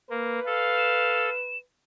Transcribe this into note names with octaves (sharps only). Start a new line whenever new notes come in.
A#3 B4
A4 F5
E7